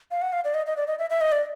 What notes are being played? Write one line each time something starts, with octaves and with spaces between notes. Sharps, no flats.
F5
F#5
F5
D5
D#5
D#5
D5
D#5
E5
E5
D#5
D5